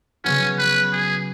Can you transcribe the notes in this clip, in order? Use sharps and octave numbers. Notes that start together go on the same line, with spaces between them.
C#3 F#3 B3 C#4 F#4
B4
G#4